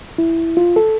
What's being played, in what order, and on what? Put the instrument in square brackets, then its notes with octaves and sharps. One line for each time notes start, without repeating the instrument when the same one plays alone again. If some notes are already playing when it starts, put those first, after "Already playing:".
[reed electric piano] E4
F4
A4